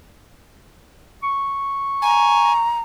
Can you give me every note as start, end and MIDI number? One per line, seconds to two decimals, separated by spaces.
1.23 2.64 85
2.02 2.53 80
2.02 2.80 82